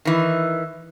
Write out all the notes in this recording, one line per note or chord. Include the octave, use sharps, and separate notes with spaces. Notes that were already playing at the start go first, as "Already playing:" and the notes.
D#3 E3